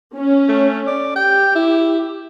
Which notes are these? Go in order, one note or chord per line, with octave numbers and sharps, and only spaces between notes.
C#4
A3
D5
G4 G5
E4